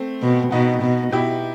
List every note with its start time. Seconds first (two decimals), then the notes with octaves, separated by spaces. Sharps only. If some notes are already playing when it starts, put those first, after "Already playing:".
Already playing: A3 C4
0.22 B2
0.52 B2 B3 D#4
0.82 B2
1.12 B2 E4 G4